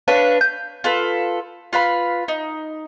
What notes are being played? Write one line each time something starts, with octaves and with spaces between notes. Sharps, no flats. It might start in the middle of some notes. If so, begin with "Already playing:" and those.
D4 B4 C#5 F5
G6
F4 A4 B4
F4 B4 F5 B5
D#4